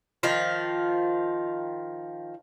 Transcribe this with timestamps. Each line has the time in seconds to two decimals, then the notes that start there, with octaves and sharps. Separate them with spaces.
0.23 D#3 F3 F4